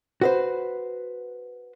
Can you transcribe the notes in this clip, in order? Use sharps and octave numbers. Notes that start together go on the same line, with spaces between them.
F#4 B4 C5